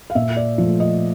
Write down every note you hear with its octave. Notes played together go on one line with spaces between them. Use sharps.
F5
A#2 E5
D5
F3 A3
D#5